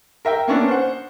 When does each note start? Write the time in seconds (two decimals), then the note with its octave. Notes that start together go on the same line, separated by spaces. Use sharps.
0.25 A#4 E5 G5
0.48 A#3 B3 C#4 D4
0.68 C5 F#5